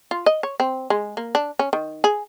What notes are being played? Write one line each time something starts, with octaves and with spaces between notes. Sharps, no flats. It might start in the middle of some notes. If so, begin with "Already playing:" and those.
F4
D#5
C#5
C4
G#3
A#3
D4
C#4
D#3
G#4